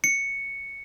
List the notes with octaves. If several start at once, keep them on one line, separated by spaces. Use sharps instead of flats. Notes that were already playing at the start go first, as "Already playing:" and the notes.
C#7